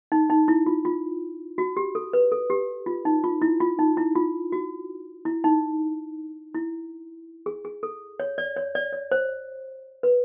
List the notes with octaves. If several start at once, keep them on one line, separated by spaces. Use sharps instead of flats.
D#4
D#4
E4
F4
F4
F#4
G4
A4
B4
A4
G4
F4
D#4
F4
E4
F4
D#4
E4
F4
F#4
E4
D#4
E4
G#4
G#4
A4
C#5
D5
C#5
D5
C#5
C5
B4